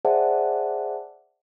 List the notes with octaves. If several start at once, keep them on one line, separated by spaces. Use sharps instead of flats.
G#4 C5 D5 E5 F#5 A5